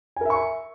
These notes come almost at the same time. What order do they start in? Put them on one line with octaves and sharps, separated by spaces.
G#5 A#4 E5 C#6